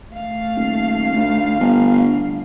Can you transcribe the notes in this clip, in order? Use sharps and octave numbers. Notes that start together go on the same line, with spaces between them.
A3 F5
D#1
D2
G1